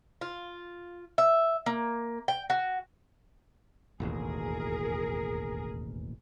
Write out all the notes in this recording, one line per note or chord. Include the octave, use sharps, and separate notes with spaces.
F4
E5
A#3
G5
F#4
E1 A1 D#2 G#4 A#4